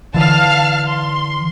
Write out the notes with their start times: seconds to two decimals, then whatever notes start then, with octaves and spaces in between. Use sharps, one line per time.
0.14 D3 E3 F5 A5 F6
0.85 C6